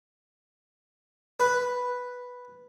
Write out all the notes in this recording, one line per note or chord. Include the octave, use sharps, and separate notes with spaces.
B4